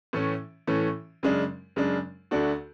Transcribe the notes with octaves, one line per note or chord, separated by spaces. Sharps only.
A2 E3 A3 C#4
A2 E3 A3 C#4
F#2 C#3 G#3 D4
F#2 C#3 G#3 D4
D2 D3 A3 D4 F#4